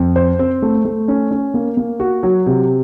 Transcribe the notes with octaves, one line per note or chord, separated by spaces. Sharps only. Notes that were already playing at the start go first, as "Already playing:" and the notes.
Already playing: F2
C5
C4
A3
A3
C#4
C#4
A#3
A#3
F#4
F#3
C3